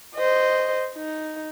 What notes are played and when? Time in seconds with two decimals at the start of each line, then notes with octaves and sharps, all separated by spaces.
0.15 C5 D#5
0.95 D#4